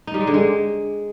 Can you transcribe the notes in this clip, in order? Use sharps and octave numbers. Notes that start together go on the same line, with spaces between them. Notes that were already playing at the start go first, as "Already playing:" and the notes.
D#4
G3
G#3
D3
G#3